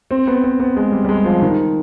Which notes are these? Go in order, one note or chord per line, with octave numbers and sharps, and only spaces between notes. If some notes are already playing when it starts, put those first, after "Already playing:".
C4
B3
C4
B3
G#3
G3
G3
G#3
F3
D#3